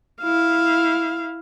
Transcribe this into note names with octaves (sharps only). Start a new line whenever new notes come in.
E4 F5